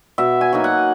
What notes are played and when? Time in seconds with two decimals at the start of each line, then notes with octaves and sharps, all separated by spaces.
0.18 B2 E5
0.41 G#5
0.53 F#3 A#3 D#4
0.64 F#5